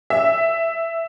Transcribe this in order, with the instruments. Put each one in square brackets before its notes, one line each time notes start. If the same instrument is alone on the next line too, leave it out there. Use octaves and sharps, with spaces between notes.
[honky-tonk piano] E5